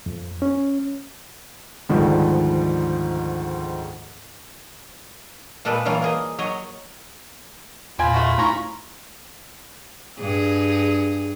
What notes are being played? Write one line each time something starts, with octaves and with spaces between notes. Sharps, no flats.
F2
C#4
D2 G#2 D#3 F3 G3
A#2 G3 G#3 A4 B4 D5
E3 F#3 G3 A#3 F4
A#3 G#4 D#5
F#3 C#5 D#5
E2 A#2 C4 F4 G#5 B5
G#3 A3 F#4
A3 C#4 D#4 E4 A#5 C#6
G2 G#4